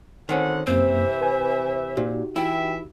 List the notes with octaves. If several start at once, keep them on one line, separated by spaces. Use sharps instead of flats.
D2 D3 D#3 C4 C#4 F#5
F#2 C3 E3 A#3 C4 C5 E5
B4 G#5
A#2 D#4 F#4 G4
E3 E4 E5 G5